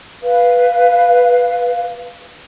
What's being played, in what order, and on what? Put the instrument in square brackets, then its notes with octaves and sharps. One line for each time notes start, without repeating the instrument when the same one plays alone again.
[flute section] B4 F5